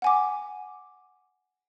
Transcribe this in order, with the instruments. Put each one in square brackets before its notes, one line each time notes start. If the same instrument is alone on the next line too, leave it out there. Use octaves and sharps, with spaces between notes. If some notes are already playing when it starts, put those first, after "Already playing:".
[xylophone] F#5 G#5 D6